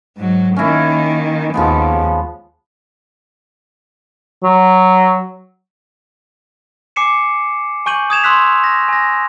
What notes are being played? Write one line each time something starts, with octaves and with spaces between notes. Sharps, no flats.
G#2 F#3
D#3 A#3 C#4 E4
D#2 F3 G#3 B3
F#3
G#5 D6 C7 C#7 E7
G#5 C#6 G6 D#7 F#7
D#6 G#6 E7 F7
C6 E6 F#6 B6
A#6
G#5 A#6